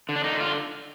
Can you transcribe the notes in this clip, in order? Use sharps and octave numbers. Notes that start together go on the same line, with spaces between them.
D3
D4
D3 D#4
F4